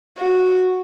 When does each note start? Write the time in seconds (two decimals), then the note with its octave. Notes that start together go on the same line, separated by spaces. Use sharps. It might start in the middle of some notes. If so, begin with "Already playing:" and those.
0.18 F#4